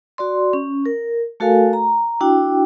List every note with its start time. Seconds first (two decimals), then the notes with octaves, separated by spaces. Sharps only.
0.18 F#4 D5 C6
0.53 C#4
0.86 A#4
1.40 A3 F#4 A4 A#4 F5 G#5
1.73 A#5
2.21 D4 E4 F#4 G5